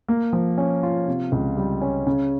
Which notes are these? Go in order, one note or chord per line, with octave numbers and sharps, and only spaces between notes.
A#3
F3
C#4
F4
C3
C#2
G3
C#4
C#3